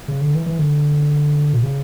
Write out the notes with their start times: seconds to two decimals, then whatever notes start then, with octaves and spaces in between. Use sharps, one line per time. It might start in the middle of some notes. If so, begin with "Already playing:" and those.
0.08 C#3
0.21 D3
0.34 E3
0.46 E3
0.59 D3
1.53 A#2
1.63 C#3